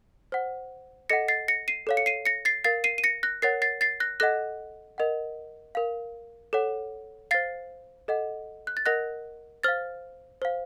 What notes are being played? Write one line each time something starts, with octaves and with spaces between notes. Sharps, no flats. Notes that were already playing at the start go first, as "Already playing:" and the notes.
C5 F#5
A4 D#5 F#5 A#6 C#7
A6 C7
A#6 C#7
C7 D#7
A4 C#5 F5
C#7
C7 D#7
A#6 C#7
A6 C7
A#4 F5 A6 C7
C7 D#7
D#7
A#6 C#7
F#6 A#6
A#4 C#5 F#5 A6 C7
A6 C7
A6 C7
F#6 A#6
A4 D#5 F#5 F#6 A#6
A#4 D#5 F#5
A#4 F5
A4 C#5 F#5
C5 F5 A6 C7
A4 D#5 F#5
F#6
A6
A#4 D#5 F#5 F#6 A#6
C5 F5 F6 A6
C5 F5